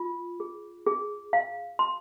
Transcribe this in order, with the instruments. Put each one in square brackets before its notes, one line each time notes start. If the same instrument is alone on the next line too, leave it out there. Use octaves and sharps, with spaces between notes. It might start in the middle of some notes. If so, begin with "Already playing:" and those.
Already playing: [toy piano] F4
G#4
G#4
F5
C6